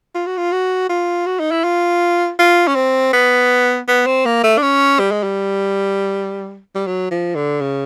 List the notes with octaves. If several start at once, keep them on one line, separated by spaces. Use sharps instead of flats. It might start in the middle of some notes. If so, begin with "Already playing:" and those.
F4
F#4
F4
F#4
F4
F#4
D#4
E4
F4
F4
C#4
C4
B3
B3
C4
A#3
A3
D4
C#4
G3
G#3
G3
G3
F#3
F3
D3
C#3